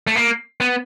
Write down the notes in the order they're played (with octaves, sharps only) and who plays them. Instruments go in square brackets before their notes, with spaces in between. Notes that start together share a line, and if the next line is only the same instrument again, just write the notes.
[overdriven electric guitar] A3
A#3
B3